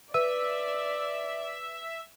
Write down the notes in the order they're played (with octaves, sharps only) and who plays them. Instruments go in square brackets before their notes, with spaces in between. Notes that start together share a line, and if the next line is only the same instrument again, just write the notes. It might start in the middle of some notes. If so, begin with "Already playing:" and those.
[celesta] B4 E6 D#7 [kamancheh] D5 [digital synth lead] E5